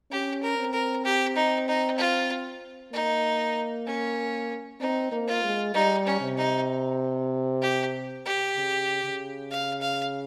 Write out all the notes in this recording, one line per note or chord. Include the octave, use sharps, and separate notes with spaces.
C#4 G4
A#4
C4
A#4
G4
D#4
D#4
F4
A#3 D#4
C#4
C4 D#4
A#3
F4
G#3
G3 D#4
C#4
C3
D#4
G4
G4
C#3
C#3
F5
F5